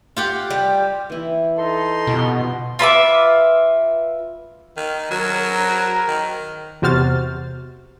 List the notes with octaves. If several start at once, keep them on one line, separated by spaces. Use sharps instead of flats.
F4 G4 F#5
G3
E3 E4
D#4 A4 C6
B2 F4 G4
F4 B4 E5 D6
D#3
F#3 A#4
D#3
E2 C3 F#4 C5 F6 A6